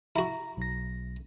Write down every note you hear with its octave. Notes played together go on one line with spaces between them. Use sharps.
E4 F#4 A#5 A#6
B1 A#6